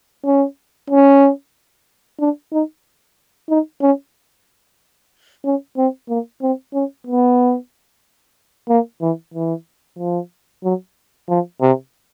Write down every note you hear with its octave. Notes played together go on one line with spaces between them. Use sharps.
C#4
C#4
D4
D#4
D#4
C#4
C#4
C4
A#3
C4
C#4
B3
A#3
E3
E3
F3
F#3
F3
C3